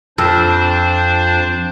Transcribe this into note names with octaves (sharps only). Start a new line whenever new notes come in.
F2 D4 C5